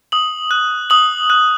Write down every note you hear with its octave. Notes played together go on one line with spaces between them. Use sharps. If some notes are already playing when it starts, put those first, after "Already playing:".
D#6 F#7
F#6
D#6 F#7
F#6